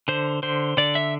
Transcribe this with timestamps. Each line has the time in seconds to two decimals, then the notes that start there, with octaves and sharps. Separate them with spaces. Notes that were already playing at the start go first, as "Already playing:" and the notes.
0.08 D3 C5
0.43 D3 C5
0.77 D3 D5
0.95 E5